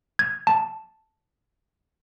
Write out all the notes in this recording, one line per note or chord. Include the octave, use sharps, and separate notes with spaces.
G#6
A5